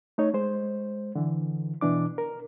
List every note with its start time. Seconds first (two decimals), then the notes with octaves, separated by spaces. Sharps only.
0.18 A3 D#4 C#5
0.34 G#3 C5
1.15 D3 E3
1.81 B2 E3 D4 D6
2.18 A#4